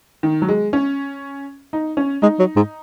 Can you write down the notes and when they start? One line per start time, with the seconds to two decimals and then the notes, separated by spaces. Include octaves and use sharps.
0.23 D#3
0.42 F#3
0.49 G#3
0.73 C#4
1.73 D#4
1.97 C#4
2.22 G#3 D#4
2.39 F#3
2.56 G#2